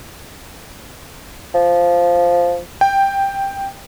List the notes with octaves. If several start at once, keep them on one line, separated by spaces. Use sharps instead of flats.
F3
G5